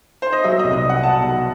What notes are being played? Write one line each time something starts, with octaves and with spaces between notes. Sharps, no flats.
C5
D#5
F#3 E5
D#5
C2
D#5
C2
F#5
B2 A5
F#3